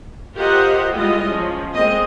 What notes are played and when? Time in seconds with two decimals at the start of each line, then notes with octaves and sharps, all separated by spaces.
0.35 F4 G4 A#4 C5 D#5 F#5
0.93 G3 G#3 E4 F4 D#5
1.27 F3 C#4
1.74 G#3 A#3 C4 D#5